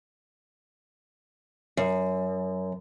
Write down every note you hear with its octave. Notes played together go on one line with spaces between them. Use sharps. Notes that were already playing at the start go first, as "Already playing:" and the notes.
F#2